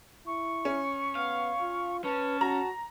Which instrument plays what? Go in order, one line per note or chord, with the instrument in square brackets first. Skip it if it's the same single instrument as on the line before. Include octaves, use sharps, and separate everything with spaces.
[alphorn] E4 [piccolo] C#6
[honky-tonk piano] C#4
[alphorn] B3 [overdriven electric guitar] F5
[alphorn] F4
[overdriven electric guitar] C#4 [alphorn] B4 [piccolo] A5
[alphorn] F#4 [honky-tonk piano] A#5